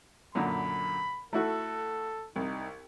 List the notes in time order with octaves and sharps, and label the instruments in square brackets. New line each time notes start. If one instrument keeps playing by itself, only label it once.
[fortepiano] F#2 A#2 D3 [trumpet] B5
[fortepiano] A3 E4 F#4 [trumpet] A4
[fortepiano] C2 [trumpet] D#4